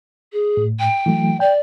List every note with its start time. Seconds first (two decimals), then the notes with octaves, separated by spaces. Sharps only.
0.32 G#4
0.57 A2
0.79 G5
1.06 E3 F#3 A3
1.40 D5 G5